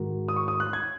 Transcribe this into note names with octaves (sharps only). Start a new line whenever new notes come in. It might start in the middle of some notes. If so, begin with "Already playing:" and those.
Already playing: G#2 D#3 G#3 F#4 A#4
D#6
C#6
D#6
F#6
G#6